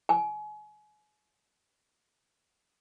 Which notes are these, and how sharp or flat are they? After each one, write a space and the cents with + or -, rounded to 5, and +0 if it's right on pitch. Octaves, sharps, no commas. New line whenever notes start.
G#5 +30 D6 -45